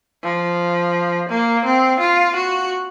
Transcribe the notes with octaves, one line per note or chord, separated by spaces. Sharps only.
F3
A#3
C4
F4
F#4